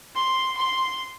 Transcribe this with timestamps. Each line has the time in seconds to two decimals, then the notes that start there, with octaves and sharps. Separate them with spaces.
0.15 C6
0.57 C6